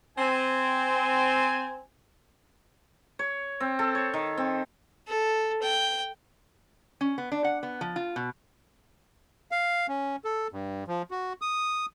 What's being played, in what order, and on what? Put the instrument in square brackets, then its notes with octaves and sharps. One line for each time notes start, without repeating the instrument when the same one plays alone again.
[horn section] C4 G#5
[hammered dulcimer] C#5
C4
A4
C#5
D#3
C4
[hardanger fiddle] A4
G5
[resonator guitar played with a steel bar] C#4
B3
D4
F#5
B3
F3
F4
B2
[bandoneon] F5
C#4
A4
G2
F3
F#4
D#6